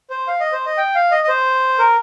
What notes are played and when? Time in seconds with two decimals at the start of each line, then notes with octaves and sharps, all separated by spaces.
0.10 C5
0.27 F5
0.40 D#5
0.52 C5
0.66 D#5
0.78 G5
0.95 F5
1.12 D#5
1.24 D#5
1.29 C5
1.79 A#4